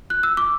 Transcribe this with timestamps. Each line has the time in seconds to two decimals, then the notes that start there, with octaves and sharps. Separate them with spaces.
0.10 F#6
0.23 E6
0.37 D6